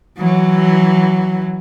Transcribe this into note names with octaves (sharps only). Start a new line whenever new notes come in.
E3 F#3